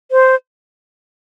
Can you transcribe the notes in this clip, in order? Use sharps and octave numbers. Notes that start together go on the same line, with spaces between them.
C5